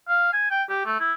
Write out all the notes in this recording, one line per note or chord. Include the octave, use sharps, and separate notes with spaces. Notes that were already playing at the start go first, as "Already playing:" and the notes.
F5
G#5
G5
G4
A3
E4